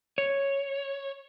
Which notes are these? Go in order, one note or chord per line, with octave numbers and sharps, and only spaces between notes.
C#5